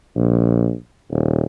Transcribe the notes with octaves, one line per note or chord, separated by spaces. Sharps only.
A#1
D#1